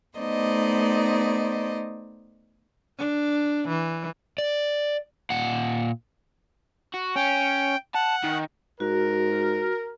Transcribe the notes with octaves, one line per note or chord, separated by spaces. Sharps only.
A3 B3 D#4 C5 D5 D#5
D4
E3
D5
A#2 F#5
F#4
C#4 G5
F#5 A5
D#3
G#2 F#4 A#4